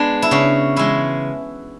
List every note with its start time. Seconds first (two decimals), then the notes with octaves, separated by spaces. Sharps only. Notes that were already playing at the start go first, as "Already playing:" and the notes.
Already playing: G#3 B3 D4
0.22 E4
0.31 C#3 F#4
0.76 E3 G#3 E4